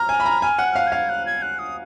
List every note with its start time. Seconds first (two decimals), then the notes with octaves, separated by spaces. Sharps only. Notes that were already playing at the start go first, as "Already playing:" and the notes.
Already playing: A#5 F6
0.09 G#5
0.20 B5
0.26 A#5
0.42 G#5 F6
0.59 F#5
0.64 F#6
0.72 F6
0.76 F5 F#6
0.87 F5 G#6
1.09 F#6
1.26 G#6
1.42 F#6
1.59 D#6